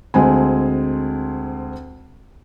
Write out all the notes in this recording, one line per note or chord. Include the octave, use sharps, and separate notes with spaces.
D2 G#3 C4 G#5